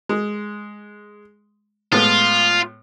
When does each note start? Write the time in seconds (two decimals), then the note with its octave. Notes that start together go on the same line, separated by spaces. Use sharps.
0.09 G#3
1.92 A2 G#3 B3 F4